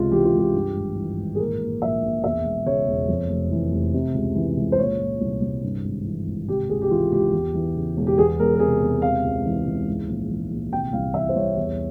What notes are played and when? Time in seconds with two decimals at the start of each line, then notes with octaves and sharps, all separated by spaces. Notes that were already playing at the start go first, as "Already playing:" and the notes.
Already playing: C#2 C3 F4
0.12 E3 G4
0.25 F4
0.34 C#2 G4
0.54 G2
0.76 G#1
0.96 E3
1.18 G#1
1.35 G#4
1.39 A#2 A#4
1.61 A#2
1.82 A#1 E5
2.02 A#1
2.24 E2 E5
2.45 E1
2.66 C#3 C#5
2.87 E1
3.08 F2
3.29 F1
3.51 E3
3.72 F1
3.94 C3
4.14 C#2
4.35 E3
4.57 C#2
4.72 C5
4.78 A#2 C#5
5.00 A#2
5.21 C2
5.42 C2
5.63 G2
5.84 G#1
6.05 E3
6.27 G#1
6.47 C3 G4
6.69 C#2 G#4
6.82 G4
6.90 E3 F4
7.12 C#2 G4
7.32 E2
7.54 E3
7.76 C#3
7.97 E1
8.07 G4
8.18 E2 G#4
8.39 E1 A#4
8.55 A#4
8.60 C3 G#4
8.81 E1
9.02 C3 F5
9.24 C#2
9.45 E3
9.67 C#2
9.87 G#2
10.08 A#1
10.30 E3
10.51 A#1
10.72 C3 G5
10.93 C2 F5
11.14 E3 E5
11.29 C5
11.35 C2 C#5
11.57 E2